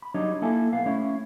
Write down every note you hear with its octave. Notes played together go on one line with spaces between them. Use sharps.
B5
F#3 G3 D4 D#4 C#5 D#5
A#3 E4 A4 E5 G#5 A5
B1 B3 F5
A3 C#4 E4 C#5